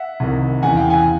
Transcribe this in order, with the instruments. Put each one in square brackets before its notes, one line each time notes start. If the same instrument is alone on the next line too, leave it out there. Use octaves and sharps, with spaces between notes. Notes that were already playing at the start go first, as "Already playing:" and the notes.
Already playing: [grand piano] E5 F#5
C2 C3 D#3
E2 C#3 E3 F#5 G#5
F5 G5
F#5 G#5